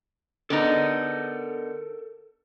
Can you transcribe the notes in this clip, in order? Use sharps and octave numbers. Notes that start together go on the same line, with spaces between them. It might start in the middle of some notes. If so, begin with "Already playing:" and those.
D3 B3 D#4 A4 A#4